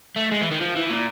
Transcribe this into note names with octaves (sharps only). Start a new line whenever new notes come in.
A3
G#3
E3
D#3
F3
E3
A#2